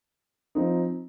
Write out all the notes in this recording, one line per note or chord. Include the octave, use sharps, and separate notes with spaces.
F3 C4 D#4